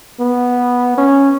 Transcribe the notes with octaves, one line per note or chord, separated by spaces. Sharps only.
B3
C#4